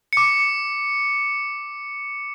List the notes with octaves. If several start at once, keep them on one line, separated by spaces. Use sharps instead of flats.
D6 C#7